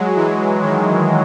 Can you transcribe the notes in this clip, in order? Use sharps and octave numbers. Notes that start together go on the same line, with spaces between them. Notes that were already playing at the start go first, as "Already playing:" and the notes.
Already playing: F#3 G#3
E3
D#3